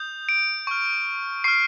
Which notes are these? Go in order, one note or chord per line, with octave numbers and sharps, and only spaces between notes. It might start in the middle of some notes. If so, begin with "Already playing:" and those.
Already playing: D#6 G6
D7
C#6 F6
C#6 F6 C7